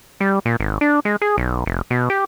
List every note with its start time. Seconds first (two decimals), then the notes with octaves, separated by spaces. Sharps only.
0.20 G3
0.46 A#2
0.60 G#1
0.81 D4
1.05 G#3
1.22 G#4
1.38 B1
1.66 F1
1.90 B2
2.10 G4